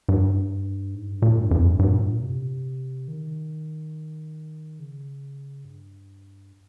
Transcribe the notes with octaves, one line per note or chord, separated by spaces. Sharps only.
G2
G#2
G2
A#2
G2
F2
G2
G2
A#2
G2
A#2
C3
D#3
C#3
G2